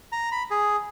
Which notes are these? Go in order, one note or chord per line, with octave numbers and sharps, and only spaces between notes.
A#5
B5
G#4